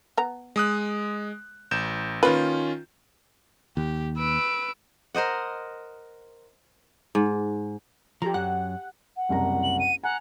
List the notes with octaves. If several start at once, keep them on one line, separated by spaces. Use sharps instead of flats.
B3 A#5
G#3 D#6 F#6
A1 G6 E7
D#3 A#3 C#4 F4 B4
D#2 G4
B4 E6 D7
A#4 C5 D#5 F#5
G#2
F3 G4 A4 A#5
F#2 F#5
F#5
F#1 C2 A#5
F#7
D#7
F#5 G#5 A#5